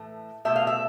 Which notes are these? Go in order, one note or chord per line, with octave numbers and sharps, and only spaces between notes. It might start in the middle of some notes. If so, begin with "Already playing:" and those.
Already playing: A2 E3 A3
B2 A3 E5
F5
E5